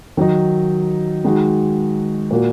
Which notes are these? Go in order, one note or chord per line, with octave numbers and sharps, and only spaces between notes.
D#3 F#3 D#4
D#3 G#3 D#4 F#4
A#2 A#3 F#4